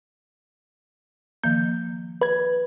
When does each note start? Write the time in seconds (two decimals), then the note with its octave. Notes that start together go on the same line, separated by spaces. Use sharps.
1.44 D#3 F3 A#3 G6
2.21 B4 G#6